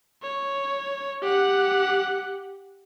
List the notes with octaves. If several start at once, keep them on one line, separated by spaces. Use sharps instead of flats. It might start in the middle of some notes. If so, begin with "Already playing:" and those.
C#5
G4 F#5